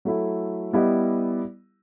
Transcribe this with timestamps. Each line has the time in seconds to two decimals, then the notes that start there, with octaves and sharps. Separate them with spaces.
0.05 F#3 A3 E4
0.73 G3 B3 E4 G4 D#5